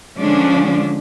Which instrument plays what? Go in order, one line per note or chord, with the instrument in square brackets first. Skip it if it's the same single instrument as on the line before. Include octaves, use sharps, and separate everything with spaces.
[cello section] D3 F3 G#3 C#4 D4